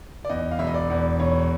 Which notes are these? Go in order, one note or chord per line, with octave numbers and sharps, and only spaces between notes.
D5
E2 D#5
F5
E1 E5
D#5
D5
E2
E1 C#5